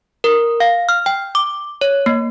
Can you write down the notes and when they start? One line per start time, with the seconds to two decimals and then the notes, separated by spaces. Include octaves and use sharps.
0.24 A#4
0.60 F5
0.89 F6
1.06 G5
1.35 D6
1.81 C#5
2.06 A#3